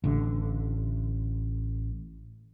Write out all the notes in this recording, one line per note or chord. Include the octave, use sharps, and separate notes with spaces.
A1 D3